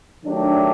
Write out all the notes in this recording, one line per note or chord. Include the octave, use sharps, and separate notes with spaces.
D#3 F#3 A3 D4 G4